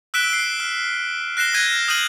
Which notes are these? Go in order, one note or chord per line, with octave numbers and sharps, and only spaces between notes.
E6 F#6 B6 D7 E7 G7
C7
F6
F#6 A#6 C7 E7 G7
F6 G6 G#6 A#6 D#7
D#6 F6 G6 D#7 F#7